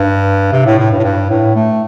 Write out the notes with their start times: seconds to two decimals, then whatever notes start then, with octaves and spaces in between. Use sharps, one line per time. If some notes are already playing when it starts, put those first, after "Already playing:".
Already playing: G2
0.52 C3
0.66 A2
0.79 A2
0.91 G2
0.99 A2
1.03 G2
1.30 A2
1.56 A3